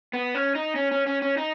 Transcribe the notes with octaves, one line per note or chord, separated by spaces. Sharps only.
B3
C#4
D#4
C#4
C#4
C#4
C#4
D#4